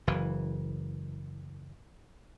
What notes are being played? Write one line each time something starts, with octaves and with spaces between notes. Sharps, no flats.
F#1 E3